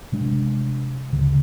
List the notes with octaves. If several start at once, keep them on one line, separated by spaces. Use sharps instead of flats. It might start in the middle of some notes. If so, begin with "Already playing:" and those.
C3 G#3 D4
D2 C#3